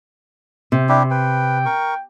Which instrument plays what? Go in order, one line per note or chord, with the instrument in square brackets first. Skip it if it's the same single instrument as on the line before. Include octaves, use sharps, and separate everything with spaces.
[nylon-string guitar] C3
[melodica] D4 E4 G4
[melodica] B4 [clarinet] G5
[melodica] A#4 C#6